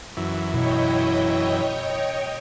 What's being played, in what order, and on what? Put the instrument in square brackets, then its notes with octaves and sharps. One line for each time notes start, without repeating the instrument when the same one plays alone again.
[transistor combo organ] F#2 E3
[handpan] B2 [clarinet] E4 [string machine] C#5 D#5 G5